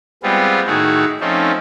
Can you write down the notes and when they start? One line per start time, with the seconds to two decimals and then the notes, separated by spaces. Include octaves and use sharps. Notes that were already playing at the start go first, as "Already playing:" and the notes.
0.23 G3 G#3 B3 C4 F4
0.67 A2 D#3 D#4 E4 F#4 G#4
1.20 F3 A3 C4 C#4 D#4